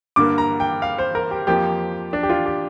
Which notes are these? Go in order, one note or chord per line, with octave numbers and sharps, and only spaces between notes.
G2 D3 A#3 D6
A#5
G5
F5
C5
A#4
G4
F2 F3 A#3 G4
D4
G4
F4
G4